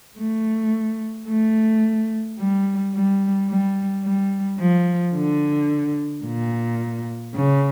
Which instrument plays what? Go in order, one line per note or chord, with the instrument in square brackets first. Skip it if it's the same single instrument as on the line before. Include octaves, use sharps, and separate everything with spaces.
[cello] A3
A3
G3
G3
G3
G3
F3
D3
A#2
C#3